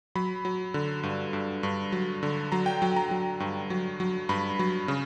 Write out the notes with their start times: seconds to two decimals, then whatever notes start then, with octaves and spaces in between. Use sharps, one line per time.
0.15 F#3 B5
0.45 F#3
0.74 D3
1.03 G2
1.33 G2
1.63 G2
1.92 F#3
2.23 D3
2.52 F#3 A#5
2.66 G5
2.82 F#3 G5
2.96 A#5
3.11 F#3
3.40 G2
3.70 F#3
4.00 F#3
4.29 G2 B5
4.59 F#3
4.88 C#3